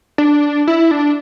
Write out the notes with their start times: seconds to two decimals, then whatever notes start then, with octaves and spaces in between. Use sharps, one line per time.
0.18 D4
0.68 E4
0.91 D4